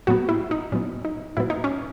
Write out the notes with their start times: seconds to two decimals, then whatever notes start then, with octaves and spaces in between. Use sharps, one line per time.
0.07 A2 F#3 B3 F#4
0.29 E4
0.51 D#4
0.72 A2 F#3 B3 C#4
1.05 D#4
1.37 A2 F#3 B3 E4
1.50 D#4
1.64 C#4